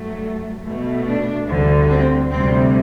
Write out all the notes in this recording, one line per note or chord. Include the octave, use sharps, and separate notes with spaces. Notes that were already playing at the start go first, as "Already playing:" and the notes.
Already playing: G2 F#3 A3
B2 A3
D4
D2 D3 G3
C4
D2 C3 G3 C4